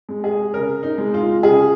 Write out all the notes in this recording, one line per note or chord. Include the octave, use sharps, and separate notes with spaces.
G#3
G#4
C#3 A#4
D#4
G#3
F4
C#3 G#4